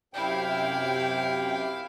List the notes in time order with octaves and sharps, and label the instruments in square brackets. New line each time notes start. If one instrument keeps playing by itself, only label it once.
[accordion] F#2 C3 G5 [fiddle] E4 F5